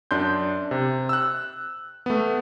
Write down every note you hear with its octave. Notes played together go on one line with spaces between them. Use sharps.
F#2 D4 C6 G6
C3
E6 F#6
A3 B3